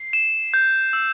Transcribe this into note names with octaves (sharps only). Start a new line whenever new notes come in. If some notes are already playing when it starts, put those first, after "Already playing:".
Already playing: C7
E7
G6
E6